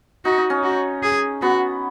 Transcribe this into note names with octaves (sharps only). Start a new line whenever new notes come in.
D#4 F#4
D#4
C#4
F#4
G#4
B3 F#4